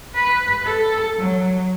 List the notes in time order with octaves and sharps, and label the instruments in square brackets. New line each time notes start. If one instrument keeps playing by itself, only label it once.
[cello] B4
A4
F#3